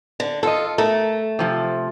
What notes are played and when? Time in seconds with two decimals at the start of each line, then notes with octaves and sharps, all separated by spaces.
0.20 D3
0.43 F4 A4 D#5
0.78 A3 A4 A#4
1.39 C3 F3